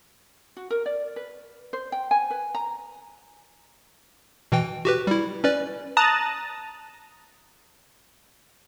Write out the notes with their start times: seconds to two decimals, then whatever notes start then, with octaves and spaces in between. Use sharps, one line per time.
0.57 F#4
0.70 A#4
0.86 D5
1.16 B4
1.73 C5
1.92 G5
2.11 G#5
2.30 B4
2.55 A#5
4.52 B2 E3 G5
4.85 F#4 G4 B4
5.07 G3 E4
5.44 C#4 B4 D5
5.97 A5 A#5 D#6 F#6 A6